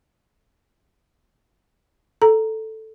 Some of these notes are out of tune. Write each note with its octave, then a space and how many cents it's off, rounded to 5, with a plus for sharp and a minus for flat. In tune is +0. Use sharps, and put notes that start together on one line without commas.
A4 +0 A#5 +0